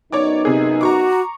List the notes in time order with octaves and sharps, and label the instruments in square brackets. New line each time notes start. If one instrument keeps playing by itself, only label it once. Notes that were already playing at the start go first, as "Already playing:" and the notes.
[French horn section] F#2 B3 D#4 [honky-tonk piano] C#5 D5 D6
[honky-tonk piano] C3 G#4
[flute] F#4 [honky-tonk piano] A#5 C#6 D6